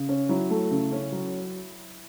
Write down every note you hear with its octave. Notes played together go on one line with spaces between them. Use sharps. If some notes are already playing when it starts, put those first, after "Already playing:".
Already playing: C#3
C#4
F#3 E4
A3
C#3
C#4
F#3